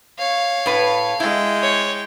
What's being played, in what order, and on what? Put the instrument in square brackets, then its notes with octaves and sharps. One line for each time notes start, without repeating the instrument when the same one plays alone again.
[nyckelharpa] C#5 [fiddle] F5
[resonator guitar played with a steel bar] A2 B4
[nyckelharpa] G#3 G5 [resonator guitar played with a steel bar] E4
[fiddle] C#5